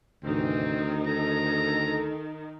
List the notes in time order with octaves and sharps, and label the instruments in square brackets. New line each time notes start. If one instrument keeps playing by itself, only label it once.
[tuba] D2 [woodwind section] G#2 C3 E3 [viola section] D#3 D#4 [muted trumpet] C4
[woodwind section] A4 [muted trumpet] A#5